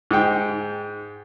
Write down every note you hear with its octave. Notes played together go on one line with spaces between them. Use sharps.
G#2 G5